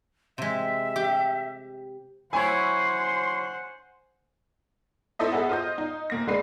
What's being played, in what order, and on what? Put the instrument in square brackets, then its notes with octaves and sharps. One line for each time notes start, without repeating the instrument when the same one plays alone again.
[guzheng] C3 G#3 [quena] E5
[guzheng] G4
[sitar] F#3 E4 C#5 [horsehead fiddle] C5 F#5 [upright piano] G#5 [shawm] C6
[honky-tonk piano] E4 A4 C5 D#5 E5
B3 F#4 G#4 A4 E5
F4 C5 D#5 G6
D#4
F1 A#3 A#6
C2 D3 G#3 D4 B4 C7